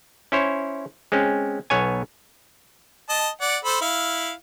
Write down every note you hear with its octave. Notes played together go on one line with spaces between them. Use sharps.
C#4 E4 C5 C#5
G#3 C4 C#4
B1 B3 C#5 G#5
D#5 A5
D5 F#5
A4 C5 B5
E4 F5